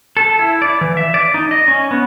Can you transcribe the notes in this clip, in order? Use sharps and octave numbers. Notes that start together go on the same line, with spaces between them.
A4
E4
D5
E3
E5
D5
D#4
D#5
C#4
B3